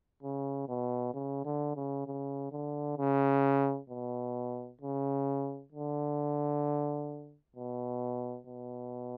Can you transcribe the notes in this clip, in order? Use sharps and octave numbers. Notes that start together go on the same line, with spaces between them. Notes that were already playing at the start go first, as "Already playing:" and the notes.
C#3
B2
C#3
D3
C#3
C#3
D3
C#3
B2
C#3
D3
B2
B2